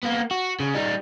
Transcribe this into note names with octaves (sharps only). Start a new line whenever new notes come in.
A#3 B3
F#4
C#3
G3 D#4